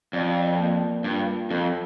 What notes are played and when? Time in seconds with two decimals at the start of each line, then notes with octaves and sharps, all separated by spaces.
0.13 F2 D5
0.59 A#3
1.04 G2 F4
1.50 F2 A4